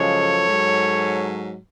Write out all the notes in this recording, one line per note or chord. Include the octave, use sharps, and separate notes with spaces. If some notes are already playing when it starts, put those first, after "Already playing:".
Already playing: F#2 C#3 F3 G#3 A4 C#5
G#2 F#3